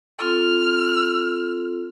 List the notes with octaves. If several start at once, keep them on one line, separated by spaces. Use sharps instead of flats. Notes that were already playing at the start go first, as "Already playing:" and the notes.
C4 F4 A4 F6